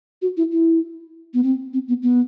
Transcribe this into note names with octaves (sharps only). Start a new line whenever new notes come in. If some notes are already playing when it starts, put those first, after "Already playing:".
F#4
E4
E4
B3
C4
C4
B3
B3